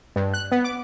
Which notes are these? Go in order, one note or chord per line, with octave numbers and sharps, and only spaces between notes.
G2
F#6
B3
D6